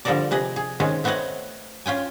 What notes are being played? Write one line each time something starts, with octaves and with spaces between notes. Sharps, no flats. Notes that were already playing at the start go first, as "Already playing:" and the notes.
D3 F3 G3 A4 A#4 D5
C3 G#4 B4 D#5
G#4
D#3 G#3 C4 C#4
A3 B3 C4 C#5 D#5 F#5
C#4 F4 G5 G#5